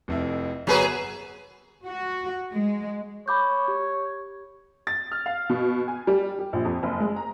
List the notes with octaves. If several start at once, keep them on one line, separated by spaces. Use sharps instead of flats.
F1 F2 E4
G1 F#3 G#4 A#4 B4 A#5
F#4
G#3
C#5 B5 D6 G6
G4
A6
F6
F5
B2
G#5
G3
G4
A#1
F2
F#1
G#3
A#5